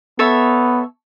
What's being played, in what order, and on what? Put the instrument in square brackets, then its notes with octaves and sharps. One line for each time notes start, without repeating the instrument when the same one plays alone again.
[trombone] B3 [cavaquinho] A4 C#5 E5